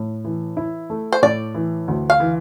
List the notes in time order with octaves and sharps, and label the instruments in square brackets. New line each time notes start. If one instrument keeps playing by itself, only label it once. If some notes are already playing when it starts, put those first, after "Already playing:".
Already playing: [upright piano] A2
E3
E4
A3
[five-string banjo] C5
[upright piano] A2 [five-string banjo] D5
[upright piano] E3
D2
[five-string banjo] F5
[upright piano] E3